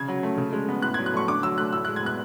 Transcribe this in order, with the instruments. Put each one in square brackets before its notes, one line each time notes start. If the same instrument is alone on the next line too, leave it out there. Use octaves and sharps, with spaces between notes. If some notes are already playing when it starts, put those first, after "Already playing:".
Already playing: [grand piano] C#3 G#6
F#3
A3
C#3
G#3
B3
A2 F#6
G#6
F#3
F#6
A3 C#6
D3 D6
F#3 E6
A3 F#6
A2 E6
F#6
G#3
G#6
B3 F#6